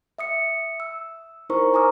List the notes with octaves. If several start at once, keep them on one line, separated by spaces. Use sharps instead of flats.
E5 D#6 C#7
E6
D#4 E4 A#4 C5 A#5 C#6
G#5 A#5 D6 D#6 F6